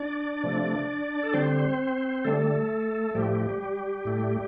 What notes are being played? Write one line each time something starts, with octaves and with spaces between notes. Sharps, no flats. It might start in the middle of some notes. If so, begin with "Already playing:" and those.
Already playing: D4 D5
C3 F3 A3
A4
D3 G3 C4 C5
D3 G3 A3 A4
A2 F3 G3 A3 G4
A2 A3